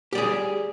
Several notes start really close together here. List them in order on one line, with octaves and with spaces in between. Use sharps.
G4 D5 G#4